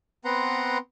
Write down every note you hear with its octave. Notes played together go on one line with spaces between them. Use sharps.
B3 C4 B4 F#5 A#5 C6